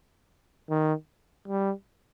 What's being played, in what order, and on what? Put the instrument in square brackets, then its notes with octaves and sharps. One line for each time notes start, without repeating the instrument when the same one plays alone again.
[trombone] D#3
G3